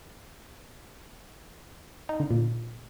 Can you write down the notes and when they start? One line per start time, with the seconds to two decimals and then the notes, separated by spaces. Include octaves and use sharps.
2.09 D#4
2.20 D3
2.31 A#2